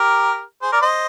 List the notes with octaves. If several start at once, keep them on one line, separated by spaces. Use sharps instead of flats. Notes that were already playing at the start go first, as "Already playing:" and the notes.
Already playing: G4 A#4
G#4 C5
A#4 D5
C5 D#5